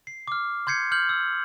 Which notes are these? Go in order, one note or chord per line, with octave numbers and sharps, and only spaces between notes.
C7
D6 F6
C6 G6 G#6 C7 C#7
F6 G6 F#7
E6